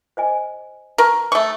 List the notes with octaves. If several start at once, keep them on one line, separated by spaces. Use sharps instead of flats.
C5 D#5 G#5
A#4 B4 A5 C#6
A3 C#6 D#6